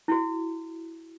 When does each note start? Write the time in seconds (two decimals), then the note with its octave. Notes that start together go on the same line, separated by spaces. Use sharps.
0.08 E4 F#4